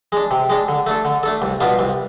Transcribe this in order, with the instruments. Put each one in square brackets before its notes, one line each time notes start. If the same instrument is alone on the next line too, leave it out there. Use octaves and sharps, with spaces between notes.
[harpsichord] G#3 D4
C3
G#3 D4
D3
A3 D4 A4
D3
A3 D4 A4
C2
B2 B3 D4 F4
C2